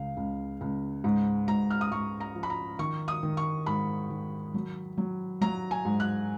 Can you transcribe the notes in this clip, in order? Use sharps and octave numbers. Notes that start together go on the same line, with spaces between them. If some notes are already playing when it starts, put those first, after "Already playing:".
Already playing: C#2 C#3 F5
C#2
C#2
G#2
G#2 A#5
F6
D#6
G#2 C#6
A#5
F3
B5
A#5
D#3 C#6
D#6
D#3
C#6
G#2 B5
D#3
F#3
F#3
F#3 A#5
G#5
G#2
F#6